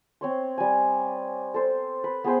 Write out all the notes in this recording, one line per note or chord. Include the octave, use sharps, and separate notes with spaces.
C4 C#5 C6
G3 G#5
A4 C5
B4
B3 G#4 C5 G5